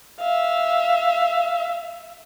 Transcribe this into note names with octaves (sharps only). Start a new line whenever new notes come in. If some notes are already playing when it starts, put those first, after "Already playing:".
E5 F5